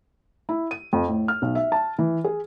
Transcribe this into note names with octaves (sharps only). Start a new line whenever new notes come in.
E4
D#7
F2
A2
F6
B1
E5
A5
E3
G#4